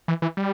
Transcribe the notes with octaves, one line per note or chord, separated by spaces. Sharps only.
E3
E3
G3